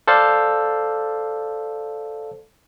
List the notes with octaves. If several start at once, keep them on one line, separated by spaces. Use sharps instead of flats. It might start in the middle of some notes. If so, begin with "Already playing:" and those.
A4 C5 D5 F5